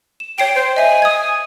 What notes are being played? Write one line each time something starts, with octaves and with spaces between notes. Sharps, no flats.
E7
C#5 G5 C7 D7
C5
D#5 E5 G#5
D#6 G#6